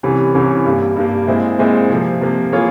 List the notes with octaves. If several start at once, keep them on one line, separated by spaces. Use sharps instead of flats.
C2 C3 E3 G3 C#4
C2 C3 E3 G3 C#4
G2 G3 A#3
G2 G3 A#3
A#2 G#3 C4 E4 G#4
A#2 G#3 C4 E4 G#4
C3 F3 A#3
C3 F3 A#3
E3 A#3 F4 G#4 C#5